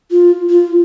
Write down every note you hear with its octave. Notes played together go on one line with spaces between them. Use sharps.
F4
F4